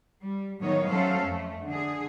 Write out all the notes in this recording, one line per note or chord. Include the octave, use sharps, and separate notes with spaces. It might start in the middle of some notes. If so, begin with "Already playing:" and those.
G3
A2 D#3 F#3 B3 D#4 C#5
F#3 A3 C#4 A4 C5 F5
F2 A3
D3 G#4